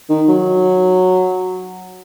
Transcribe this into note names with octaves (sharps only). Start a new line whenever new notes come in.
D#3
F#3